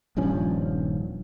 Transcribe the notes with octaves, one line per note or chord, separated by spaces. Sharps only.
D#1 G2 F3 C#4